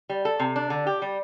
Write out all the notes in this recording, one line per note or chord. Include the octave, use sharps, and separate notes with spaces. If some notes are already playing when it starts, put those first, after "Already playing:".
G3
A4
C3
D4
D3
G4
G3